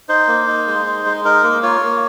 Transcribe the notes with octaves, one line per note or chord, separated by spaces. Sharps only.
D#4 C5
A#3
D#4
G#3
D#4
G#3
D#4 A#4
A#3
F4 C#5
A#3